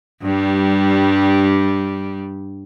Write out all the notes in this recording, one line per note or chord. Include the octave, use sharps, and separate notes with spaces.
G2 G3